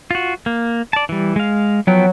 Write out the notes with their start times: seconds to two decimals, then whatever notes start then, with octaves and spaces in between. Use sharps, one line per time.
0.11 F4 F#4
0.46 A#3
0.93 D5 A5
1.09 E3 G3
1.36 G#3 F5
1.87 F3 F#3 B3 G5